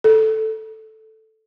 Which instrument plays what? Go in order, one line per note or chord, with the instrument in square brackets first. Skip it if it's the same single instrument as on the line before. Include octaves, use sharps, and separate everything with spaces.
[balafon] A4